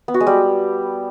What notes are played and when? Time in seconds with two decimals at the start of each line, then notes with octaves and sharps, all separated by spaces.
0.08 B3
0.14 F#4
0.20 G#3
0.27 G3